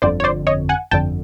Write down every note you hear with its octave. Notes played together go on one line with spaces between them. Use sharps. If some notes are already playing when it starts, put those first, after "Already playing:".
G1 F2 D3 C5 D5
C#5
C5 D5
C#5 D#5
F#5 G#5
G1 F2 D3 G5 A5